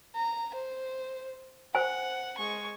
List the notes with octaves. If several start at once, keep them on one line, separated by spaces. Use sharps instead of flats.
A#5
C5
C5 F#5 G#5
G#3 C#6